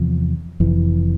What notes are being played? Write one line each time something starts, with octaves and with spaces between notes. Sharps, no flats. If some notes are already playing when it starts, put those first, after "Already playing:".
Already playing: E2 C3 F3
F1 F2 E3